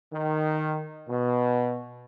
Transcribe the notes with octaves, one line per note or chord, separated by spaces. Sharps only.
D#3
B2